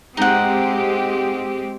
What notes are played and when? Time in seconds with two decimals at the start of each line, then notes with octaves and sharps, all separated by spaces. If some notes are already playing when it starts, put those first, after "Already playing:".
0.17 G#3 C4 D#4 G4 F#5